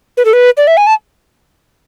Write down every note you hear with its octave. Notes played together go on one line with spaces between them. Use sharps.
B4
A4
B4
D5
E5
G#5
A5